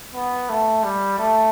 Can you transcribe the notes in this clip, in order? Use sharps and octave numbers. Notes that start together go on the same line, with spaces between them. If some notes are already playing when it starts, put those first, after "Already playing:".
B3
A3
G3
A3